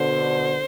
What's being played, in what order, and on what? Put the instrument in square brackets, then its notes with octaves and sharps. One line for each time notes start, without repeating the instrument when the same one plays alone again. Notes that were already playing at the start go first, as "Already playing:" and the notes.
Already playing: [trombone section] B2 D3 [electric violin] C5